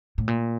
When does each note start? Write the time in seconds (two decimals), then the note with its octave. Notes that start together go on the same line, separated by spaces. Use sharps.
0.18 A2
0.28 A#2